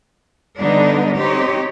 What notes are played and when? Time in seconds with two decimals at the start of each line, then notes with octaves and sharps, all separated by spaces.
0.59 D3 G3 B3 D4 D#4
1.16 C4 D#4 G4 C#5